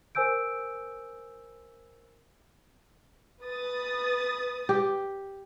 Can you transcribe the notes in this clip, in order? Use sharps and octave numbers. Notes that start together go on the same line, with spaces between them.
A#4 C5 G#5 E6 G6 D7
B4 D#6 A6
G4